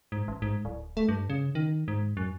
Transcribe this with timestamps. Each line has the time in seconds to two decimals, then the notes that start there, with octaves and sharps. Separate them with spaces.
0.12 G#2
0.28 A1
0.42 G#2
0.65 D1
0.97 A3
1.09 G2
1.30 C#3
1.55 D#3
1.88 G#2
2.17 F#2